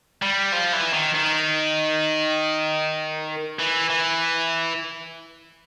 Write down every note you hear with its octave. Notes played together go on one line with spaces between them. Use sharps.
G3
F3
E3
D#3
D#3
E3
E3